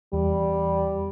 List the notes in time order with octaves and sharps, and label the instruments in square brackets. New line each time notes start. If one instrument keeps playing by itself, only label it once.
[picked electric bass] E2 [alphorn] G3